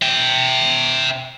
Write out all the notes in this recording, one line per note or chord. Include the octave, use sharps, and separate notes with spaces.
E5 G5